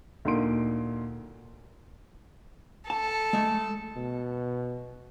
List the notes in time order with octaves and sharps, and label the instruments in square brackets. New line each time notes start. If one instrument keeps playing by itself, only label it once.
[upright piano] D2 A#2 A#3 D#4 C6 D7
[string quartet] A4 [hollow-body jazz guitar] A5
[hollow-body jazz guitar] G#3 A3
[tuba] B2